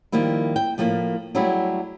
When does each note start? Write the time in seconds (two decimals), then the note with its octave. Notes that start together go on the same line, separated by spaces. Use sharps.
0.12 D#3 F3 G3 A#3 E4
0.56 G5
0.78 A2 F3 A3 A#3
1.35 F#3 G3 A3 E4 G4 G#4